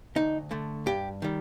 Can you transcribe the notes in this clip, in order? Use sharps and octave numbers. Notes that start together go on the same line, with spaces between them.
D2 D#4
D3 A3
G2 G4
D#3 G3